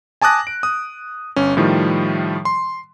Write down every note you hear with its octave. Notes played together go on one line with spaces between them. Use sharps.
G#5 A5 D6 D#6 F#6 A#6
D7
D#6
G1 C#4
A2 D#3 F3 G3
C6